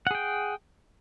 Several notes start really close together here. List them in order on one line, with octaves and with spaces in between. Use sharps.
F#5 G#4 G5